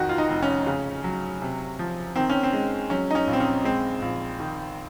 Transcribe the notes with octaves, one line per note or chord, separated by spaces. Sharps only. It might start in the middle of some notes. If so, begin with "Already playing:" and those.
Already playing: F2 D#3 F#4
F4
D#4
F1
C#4
C#3
F#3
C3
F3
D#3 C4
C#4
C4
G#3
F#3 C#4
D#4
C#4
A#1
C4
C#4
G#3 C4
A#1
D#3